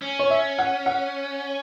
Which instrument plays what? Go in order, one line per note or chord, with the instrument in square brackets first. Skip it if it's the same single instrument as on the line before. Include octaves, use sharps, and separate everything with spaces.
[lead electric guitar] C#4
[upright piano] C#5
E5
F#5
F#5